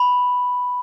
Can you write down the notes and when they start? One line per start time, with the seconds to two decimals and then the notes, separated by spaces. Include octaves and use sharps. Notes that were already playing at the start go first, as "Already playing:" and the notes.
Already playing: B5